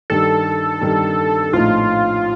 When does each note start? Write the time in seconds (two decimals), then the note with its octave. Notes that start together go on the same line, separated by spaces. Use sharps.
0.10 G2 D#3 G3 A4
0.81 G2 D#3 G3
1.53 A#1 A2 F3 A3 D#4 F4